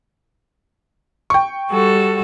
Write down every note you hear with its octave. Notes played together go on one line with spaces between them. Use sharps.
G5 C#6
G3 F#4 A4